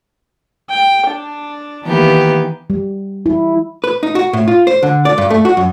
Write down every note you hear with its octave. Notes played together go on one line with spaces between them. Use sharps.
G5
D4
D#3 E3 A#3 B3 G4 B4
G3
E4
B4
D#4
F#4
A2
F4
C5
D3
D5
G2
A3
F#4
F#2